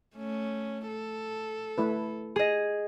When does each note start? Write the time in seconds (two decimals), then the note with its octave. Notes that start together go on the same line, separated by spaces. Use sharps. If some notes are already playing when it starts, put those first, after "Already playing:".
0.16 A3 C#4
0.88 A4
1.78 A3 E4 B4
2.36 G#4 D#5